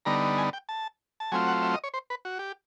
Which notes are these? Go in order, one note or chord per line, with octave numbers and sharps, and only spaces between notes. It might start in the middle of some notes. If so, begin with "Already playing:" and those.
D3 G3 B3 D#4 A#5
G#5
G5
A5
A5
F#3 A3 C4 F4 G#5
F#5
E5
D#5
C#5
C5
B4
F#4
G4